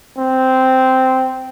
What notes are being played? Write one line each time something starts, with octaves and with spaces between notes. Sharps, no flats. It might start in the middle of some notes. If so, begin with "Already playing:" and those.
C4